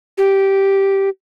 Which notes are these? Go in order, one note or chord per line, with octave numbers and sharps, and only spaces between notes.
G4